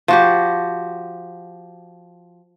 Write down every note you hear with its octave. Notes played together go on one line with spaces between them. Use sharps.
F3 F#4 G4